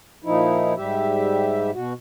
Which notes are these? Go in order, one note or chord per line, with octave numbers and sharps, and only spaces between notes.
A#2 F3 D#4 E4
G#2 G3 G4 E5
B2 F#4